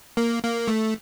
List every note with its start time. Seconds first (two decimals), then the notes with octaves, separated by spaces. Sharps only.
0.17 A#3
0.43 A#3
0.68 A3